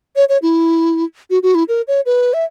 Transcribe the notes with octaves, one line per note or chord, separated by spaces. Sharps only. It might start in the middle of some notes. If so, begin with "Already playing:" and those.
C#5
C#5
E4
F#4
F#4
E4
A#4
C#5
B4
E5